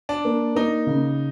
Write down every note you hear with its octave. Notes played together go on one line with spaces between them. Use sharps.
D4
A#3
A#3 D#4
C#3